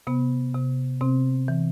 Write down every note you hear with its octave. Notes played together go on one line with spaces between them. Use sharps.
C3 B3
C3
C3 C4
E3